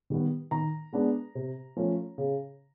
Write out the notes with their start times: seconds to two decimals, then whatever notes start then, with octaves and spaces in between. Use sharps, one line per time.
0.10 D#3 G3 B3
0.51 D#3 A#5
0.93 G#3 B3 D4
1.35 C3
1.77 F3 A3 C#4
2.18 C#3